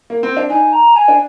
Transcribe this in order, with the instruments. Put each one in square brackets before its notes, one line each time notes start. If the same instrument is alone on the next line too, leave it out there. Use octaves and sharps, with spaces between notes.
[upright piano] A#3
C4
D4
[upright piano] D#4 [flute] G#5
[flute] A#5
G#5
[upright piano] D4